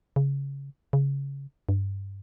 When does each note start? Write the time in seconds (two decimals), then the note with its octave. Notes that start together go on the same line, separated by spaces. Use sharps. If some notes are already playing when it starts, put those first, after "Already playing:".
0.16 C#3
0.93 C#3
1.69 G2